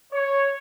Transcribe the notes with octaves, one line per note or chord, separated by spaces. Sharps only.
C#5